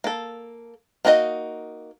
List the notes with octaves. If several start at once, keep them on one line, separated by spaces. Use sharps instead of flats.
A#3 A4
A#3 D#4 F#4 G#4 D#5